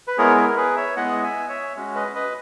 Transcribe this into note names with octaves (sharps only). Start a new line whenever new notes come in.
B4
G#3 B3 E4 G#4 A#4 C#5
A#4
G#4 B4
C#5 E5
G#3 B3 E4 G#4 D#5 F#5
E5 G#5
C#5 E5
G#3 C#4 F#4
B4 D#5
B4 D#5